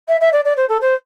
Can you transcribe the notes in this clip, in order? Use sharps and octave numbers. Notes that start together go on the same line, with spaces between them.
E5
E5
D5
D5
C5
A4
C5